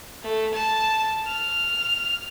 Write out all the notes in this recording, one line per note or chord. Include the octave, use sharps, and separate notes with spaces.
A3
A5
F6